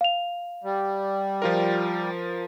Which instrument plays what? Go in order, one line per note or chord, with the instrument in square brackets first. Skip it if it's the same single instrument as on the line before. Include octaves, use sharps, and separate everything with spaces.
[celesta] F5 F7
[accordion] G3
[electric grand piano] F3 F4 A#4